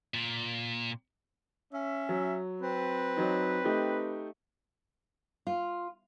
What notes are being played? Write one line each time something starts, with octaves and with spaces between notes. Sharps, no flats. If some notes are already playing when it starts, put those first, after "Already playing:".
A#2
C#4 E5
F#3
C4 B4
F#3 D#4
A3 D#4 G4
F4